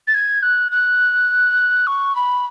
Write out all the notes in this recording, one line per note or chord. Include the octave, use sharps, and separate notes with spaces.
A6
G#6
F#6
F#6
C#6
B5